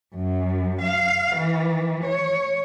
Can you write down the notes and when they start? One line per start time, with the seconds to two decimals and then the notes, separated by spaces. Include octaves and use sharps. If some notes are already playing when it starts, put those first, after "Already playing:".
0.15 F#2
0.82 F5
1.37 E3
2.04 C#5